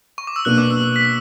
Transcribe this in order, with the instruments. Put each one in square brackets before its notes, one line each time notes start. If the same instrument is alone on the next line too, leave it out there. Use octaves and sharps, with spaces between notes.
[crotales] C#6
D6
E6
[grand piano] B2 A#3 D4 [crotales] F#6
[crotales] D6
E6
E6
B6